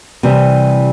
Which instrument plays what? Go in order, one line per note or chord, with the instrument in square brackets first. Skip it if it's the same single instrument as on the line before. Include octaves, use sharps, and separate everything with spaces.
[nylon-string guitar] C3 E3 G3